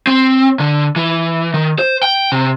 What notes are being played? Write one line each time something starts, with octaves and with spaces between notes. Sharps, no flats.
C4
D3
E3
D#3
C5
G5
C3